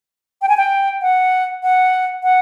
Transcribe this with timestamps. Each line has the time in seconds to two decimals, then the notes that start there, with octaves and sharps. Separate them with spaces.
0.42 G5
0.49 G#5
0.57 G5
1.02 F#5
1.63 F#5
2.23 F#5